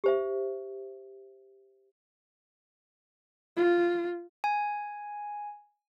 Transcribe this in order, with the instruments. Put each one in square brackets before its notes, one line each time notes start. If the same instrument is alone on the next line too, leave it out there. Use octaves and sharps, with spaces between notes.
[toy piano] G4 C5 E5
[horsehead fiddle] F4
[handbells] G#5